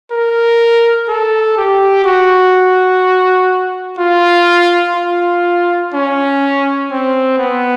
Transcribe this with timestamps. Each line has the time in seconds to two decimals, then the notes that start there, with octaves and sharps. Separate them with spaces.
0.11 A#4
1.08 A4
1.57 G4
2.04 F#4
3.99 F4
4.96 F4
5.93 C#4
6.91 C4
7.38 B3